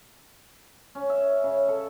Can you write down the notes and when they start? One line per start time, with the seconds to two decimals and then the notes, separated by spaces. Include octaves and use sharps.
0.95 C#4
1.09 E5
1.44 C#3
1.68 A4